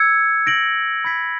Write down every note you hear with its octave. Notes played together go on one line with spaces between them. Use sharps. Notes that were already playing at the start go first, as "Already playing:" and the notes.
Already playing: E6 G#6 C#7
G6 A#6 D7 F#7
B5 E6 G#6 B6 D7